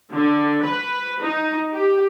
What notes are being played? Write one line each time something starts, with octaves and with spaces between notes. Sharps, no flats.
D3
B4
D#4
G4